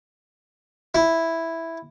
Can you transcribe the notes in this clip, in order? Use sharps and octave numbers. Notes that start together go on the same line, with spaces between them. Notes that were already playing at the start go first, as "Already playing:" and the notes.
E4